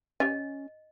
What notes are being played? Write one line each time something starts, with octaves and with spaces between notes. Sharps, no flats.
C#4 G4 C#5 D#5 G#5